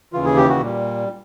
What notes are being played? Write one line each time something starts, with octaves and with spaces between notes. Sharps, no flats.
D#2 C#3 E3 F4
G#4
G4
F#4
A#2 G3